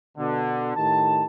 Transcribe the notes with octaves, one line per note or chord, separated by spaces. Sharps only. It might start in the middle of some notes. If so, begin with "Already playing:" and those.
B2 D3
A2 D#3 G4 A5